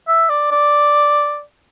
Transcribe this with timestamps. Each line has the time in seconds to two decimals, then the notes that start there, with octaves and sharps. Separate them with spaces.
0.08 E5
0.30 D5
0.51 D5